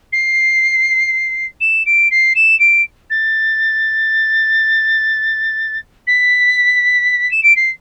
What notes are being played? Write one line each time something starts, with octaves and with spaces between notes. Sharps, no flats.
C7
E7
D7
C7
E7
D7
A6
B6
E7
D7
C7